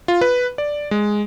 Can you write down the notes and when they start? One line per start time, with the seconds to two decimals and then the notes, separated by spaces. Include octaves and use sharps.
0.08 F4
0.21 B4
0.58 D5
0.91 G#3